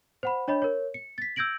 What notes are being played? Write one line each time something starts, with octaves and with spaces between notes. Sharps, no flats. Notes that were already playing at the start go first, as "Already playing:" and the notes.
C5 F#5 B5
D4 C#5 D#5 B5
A#4 C#5
C#7
A6 B6
E6 G6 G#6 A#6 D7 F#7